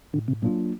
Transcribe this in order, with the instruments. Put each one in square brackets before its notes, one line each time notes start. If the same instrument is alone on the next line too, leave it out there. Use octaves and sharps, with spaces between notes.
[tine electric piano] A2 [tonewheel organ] D3
[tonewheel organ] C3
[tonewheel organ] A#2 [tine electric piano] F#3 A#3 D4 F4